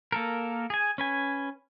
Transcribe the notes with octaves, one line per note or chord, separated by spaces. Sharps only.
A#3 A4 A#4
G#4 G#5
C#4 B4 G#5